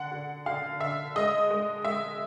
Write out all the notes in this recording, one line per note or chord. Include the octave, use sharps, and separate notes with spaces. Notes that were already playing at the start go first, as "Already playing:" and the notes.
Already playing: D3 F#5
D3
D3 F5
D3 E5
G#3 D#5
G#3
G#3 E5